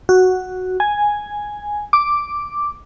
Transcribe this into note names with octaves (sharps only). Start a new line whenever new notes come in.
F#4
G#5
D6